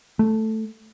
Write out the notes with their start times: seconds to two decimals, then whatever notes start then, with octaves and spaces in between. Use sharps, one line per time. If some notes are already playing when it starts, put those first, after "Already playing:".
0.19 A3